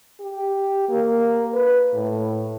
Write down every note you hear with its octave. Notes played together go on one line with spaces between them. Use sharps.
G4
A#3
B4
A2